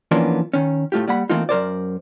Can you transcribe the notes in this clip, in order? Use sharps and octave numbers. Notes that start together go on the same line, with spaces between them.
E3 F3 A#3 B3 C#4 D4
D#3 C#4
A2 A3 F4 G4
G3 A#3 F#5 B5
E3 A3 A#3 C4 D#4 F4
F#2 A#4 C5 D5